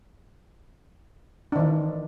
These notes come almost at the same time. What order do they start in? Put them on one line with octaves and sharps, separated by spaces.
D4 D#3 E3